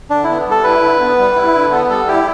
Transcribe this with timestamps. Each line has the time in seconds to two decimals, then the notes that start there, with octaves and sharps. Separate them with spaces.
0.10 D3 D4
0.24 E4
0.29 B3
0.47 G3 A4
0.64 E4 B4
0.82 D3
1.00 B3
1.18 G3
1.35 E4
1.54 D3
1.71 B3 A4
1.90 G3 A4
2.07 E4 G4